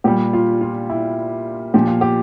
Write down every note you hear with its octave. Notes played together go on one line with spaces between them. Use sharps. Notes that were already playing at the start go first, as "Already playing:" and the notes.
A#2 G3 G4
F4
F4
E4
A#2 F3 G4
F4
G4